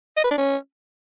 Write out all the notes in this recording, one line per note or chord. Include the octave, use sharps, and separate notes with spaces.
D#5
B4
D4
C#4